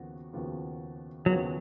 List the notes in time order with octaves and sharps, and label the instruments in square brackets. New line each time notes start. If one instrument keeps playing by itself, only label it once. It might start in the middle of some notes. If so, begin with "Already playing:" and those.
Already playing: [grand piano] D#2 C#3 F3 B3 F#4
D#2 C#3 F3 B3 F#4
[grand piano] D#2 C#3 F3 B3 F#4 [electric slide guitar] F#3